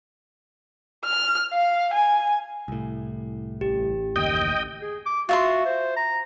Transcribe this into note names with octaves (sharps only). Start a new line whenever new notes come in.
F6
F5
G#5
C2 A2
A1 G4
F#1 D#2 D#5 G5
G#4
D6
F4 F#4 E5 C6
C5
A#5